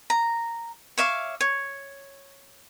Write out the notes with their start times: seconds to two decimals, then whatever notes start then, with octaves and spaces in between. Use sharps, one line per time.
0.10 A#5
0.98 C#5 E5 F5 D6
1.41 C#5